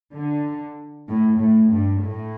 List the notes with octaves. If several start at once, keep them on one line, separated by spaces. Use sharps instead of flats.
D3
A2
A2
G2
A2